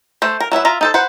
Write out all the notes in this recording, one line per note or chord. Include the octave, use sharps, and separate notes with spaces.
A3 C5
A#4
F#3 E4 B4 E5
F4 E5 A#5
D#4 A4 C5
B4 C5 F#5